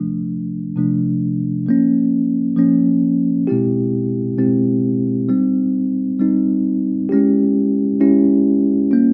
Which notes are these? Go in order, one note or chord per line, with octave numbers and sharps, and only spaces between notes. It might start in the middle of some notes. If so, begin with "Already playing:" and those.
Already playing: C3 F3 A3 D4
C3 F3 A3 D4
F3 A#3 C#4
F3 A#3 C#4
B2 G#3 C4 E4 G4
B2 G#3 C4 E4 G4
G3 C4 D#4
G3 C4 D#4
G#3 C#4 E4 G4
G#3 C#4 E4 G4
G3 A#3 C#4 F4